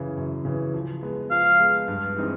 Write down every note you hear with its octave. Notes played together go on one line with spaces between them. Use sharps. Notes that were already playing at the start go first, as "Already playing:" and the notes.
Already playing: F#2 C#3 E3
F#2
C#3 E3
F3
G#3 B3
F3 F5
G#3 B3
G2
E3 G#3 C4 D#4